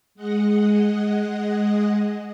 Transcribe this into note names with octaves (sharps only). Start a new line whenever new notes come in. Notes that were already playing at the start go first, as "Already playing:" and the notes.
G#3 D#5 F#5